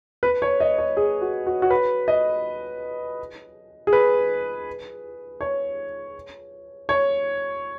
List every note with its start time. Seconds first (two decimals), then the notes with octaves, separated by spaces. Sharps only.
0.23 B4
0.42 C#5
0.60 D#5
0.78 C#5
0.97 G#4
1.21 F#4
1.47 F#4
1.62 F#4
1.70 B4
2.08 D#5
3.87 G#4
3.93 B4
5.41 C#5
6.89 C#5